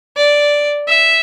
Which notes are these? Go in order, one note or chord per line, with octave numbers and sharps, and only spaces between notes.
D5
E5